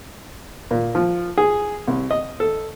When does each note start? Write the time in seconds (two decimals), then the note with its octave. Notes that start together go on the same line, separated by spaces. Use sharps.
0.71 A#2
0.95 F3
1.38 G#4
1.87 C2
2.11 D#5
2.40 A4